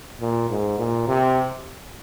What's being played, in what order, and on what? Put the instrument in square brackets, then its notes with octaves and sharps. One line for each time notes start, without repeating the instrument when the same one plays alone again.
[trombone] A#2
G#2
A#2
C3